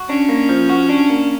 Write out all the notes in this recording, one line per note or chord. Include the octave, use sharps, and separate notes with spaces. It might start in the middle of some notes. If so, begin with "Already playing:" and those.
Already playing: F#4
C#4 D4
A#3
F3
F#4
D4
A#3